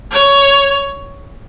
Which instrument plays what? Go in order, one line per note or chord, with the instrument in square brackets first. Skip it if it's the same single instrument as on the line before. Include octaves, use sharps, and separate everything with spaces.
[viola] C#5